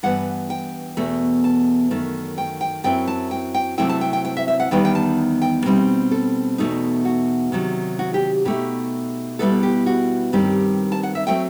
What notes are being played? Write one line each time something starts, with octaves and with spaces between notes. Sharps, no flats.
G2 E3 B3 F#5
G5
E2 B2 A3
A5
F#2 D#3 A3
G5
G5
F#2 F#3 C4 E4 G5
A5
G5
G5
C3 F#3 A3 C4 E4 G5
A5
G5
G5
G5
E5
E5
F#5
E2 D#3 G3 B3 D#4 G5
G5
A5
G5
B2 G3 C4 D#4
A4
E2 B2 A3 D#4
F#4
C3 D#3 F#3
F#4
G4
B2 A3 D#4 G4
B2 G3 B3 E4 A4
G4
F#4
G2 D#3 G3 C4 G4
A5
F#5
E5
F#3 A3 C4 G5